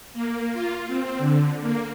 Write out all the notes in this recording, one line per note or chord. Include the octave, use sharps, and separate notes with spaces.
A#3
F4
C4
D3
A#3